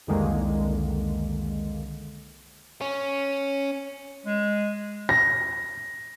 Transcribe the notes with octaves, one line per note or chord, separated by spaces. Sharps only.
C2 F2 D3 D#3 G#3 A#3
C#4
G#3
A#6